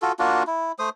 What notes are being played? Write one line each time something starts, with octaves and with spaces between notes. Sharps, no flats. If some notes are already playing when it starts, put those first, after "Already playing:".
F4 F#4 A4
A#3 D4 F4 F#4
E4
A3 C5 D#6